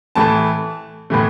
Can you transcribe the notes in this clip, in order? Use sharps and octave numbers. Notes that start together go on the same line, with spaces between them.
A2 E3 A3 A5
A2 E3 A3